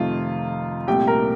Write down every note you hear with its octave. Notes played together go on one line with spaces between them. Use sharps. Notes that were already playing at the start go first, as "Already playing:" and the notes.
Already playing: F2 C3 D#3 A3 F4
C2 A#2 A3 G4 G5
A#4 A#5